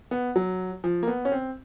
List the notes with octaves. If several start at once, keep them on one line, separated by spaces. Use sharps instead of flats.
B3
F#3
F3
A#3
B3
C#4
C4